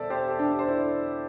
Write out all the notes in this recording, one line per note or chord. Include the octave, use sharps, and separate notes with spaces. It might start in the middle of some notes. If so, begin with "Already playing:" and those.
Already playing: E1 E2 D3 G3 A4 C5 D5 E5
G4 C5
A4
D4 G4
C5
E4 A4